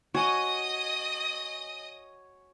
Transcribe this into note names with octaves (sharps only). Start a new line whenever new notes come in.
F#4 C#5 D#5 G#5 D#6